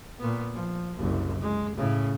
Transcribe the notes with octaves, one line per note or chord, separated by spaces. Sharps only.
A#2 B3
F3
F#1 C2
G#3
A2 C#3